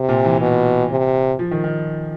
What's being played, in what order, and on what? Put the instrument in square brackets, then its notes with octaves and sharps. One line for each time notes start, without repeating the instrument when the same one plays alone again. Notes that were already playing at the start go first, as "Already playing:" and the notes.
Already playing: [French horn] C3
[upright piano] A#2
E3
[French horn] B2
C3
[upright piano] F3
D#3
D#3